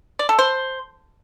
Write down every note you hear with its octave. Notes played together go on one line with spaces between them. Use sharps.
D5
A4
C5